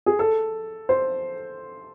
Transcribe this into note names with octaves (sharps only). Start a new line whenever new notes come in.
G#4
A4
C5